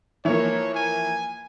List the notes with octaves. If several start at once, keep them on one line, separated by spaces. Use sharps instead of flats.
E3 F3 A#3 C#5
G#5